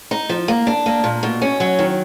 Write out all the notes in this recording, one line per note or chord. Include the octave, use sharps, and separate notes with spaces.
D#4
F3
A#3
D4
A#3
A#2
B2
C#4
F#3
D#3